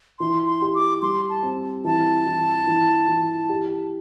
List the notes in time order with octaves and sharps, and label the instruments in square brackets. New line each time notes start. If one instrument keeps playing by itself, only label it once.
[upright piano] E3 [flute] C6
[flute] C6
[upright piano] G4
[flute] D6
[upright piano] G3 [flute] C6
[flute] A5
[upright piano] C4
[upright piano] E3 [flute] A5
[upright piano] E3
E3
E3
G4